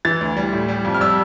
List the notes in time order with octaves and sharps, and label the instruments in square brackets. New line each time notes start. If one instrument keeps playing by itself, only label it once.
[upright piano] E3 A6
D2
G3
A2
G3
F2
F6
G3 E6